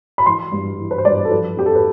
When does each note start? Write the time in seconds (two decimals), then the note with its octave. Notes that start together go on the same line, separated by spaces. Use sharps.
0.18 B5
0.26 E3 C6
0.52 G2
0.79 E3
0.91 B4
0.98 C5
1.05 G2 D5
1.25 A4
1.30 F3 B4
1.57 F2 G4
1.66 A4
1.75 B4